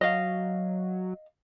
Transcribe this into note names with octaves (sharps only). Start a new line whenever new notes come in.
F#3 D#5 F5